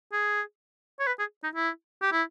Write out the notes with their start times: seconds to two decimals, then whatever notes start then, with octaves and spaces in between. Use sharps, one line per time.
0.13 G#4
1.00 C#5
1.07 B4
1.19 G#4
1.43 D#4
1.55 E4
2.02 G4
2.12 E4